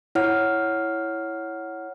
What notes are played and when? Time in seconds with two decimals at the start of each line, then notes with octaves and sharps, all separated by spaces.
0.15 E4 C#5 F#5 F6